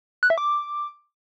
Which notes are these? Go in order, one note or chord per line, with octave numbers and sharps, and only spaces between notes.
F#6
E5
D6